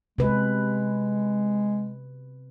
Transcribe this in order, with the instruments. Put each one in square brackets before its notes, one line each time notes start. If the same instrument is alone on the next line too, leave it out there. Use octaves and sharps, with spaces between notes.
[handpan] C3 B4 [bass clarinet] G#3